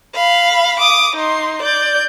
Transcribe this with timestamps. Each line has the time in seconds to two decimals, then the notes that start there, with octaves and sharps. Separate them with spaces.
0.14 F5 B5
0.79 D6 D#6
1.15 D#4 C6
1.62 D5 G6